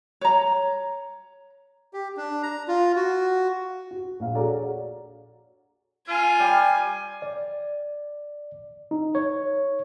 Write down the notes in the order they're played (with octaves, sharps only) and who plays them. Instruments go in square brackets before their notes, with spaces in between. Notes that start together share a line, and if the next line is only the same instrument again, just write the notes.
[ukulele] C#5 A#5
[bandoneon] G4
D4
A#5
F4
F#4
[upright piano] F#4
A#1 F5
F#4 G#4 A4 C#5 D5 A#5
[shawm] F4 [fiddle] G#5
[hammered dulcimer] G3
[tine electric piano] D5
D#4
C#5